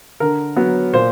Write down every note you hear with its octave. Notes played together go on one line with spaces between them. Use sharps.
D3 A#4
F#3 B3
A#2 C5